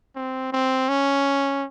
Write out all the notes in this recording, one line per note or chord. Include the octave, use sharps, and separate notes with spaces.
C4
C4
C#4